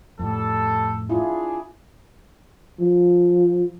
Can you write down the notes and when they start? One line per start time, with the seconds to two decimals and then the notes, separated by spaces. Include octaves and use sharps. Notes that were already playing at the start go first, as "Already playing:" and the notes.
0.19 F2 A2 G3 A4
1.10 D4 E4 F4 G#4
2.80 F3